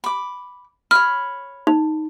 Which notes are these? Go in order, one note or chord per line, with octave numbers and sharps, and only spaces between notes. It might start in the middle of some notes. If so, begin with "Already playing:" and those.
B5 D6
C#5 B5 F6
D#4